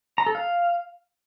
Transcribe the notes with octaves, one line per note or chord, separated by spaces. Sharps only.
A#5
A4
F5